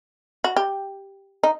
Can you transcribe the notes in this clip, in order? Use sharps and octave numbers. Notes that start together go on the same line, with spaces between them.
F#4
G4
D#4